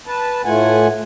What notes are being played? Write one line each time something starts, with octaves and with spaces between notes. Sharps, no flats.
B4 A5
A2 A3 F4 F#5 G#5